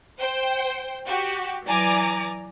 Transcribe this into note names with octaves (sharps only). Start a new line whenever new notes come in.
C5 G5
F#4 G4
E3 F#3 D5 G#5 A#5 D6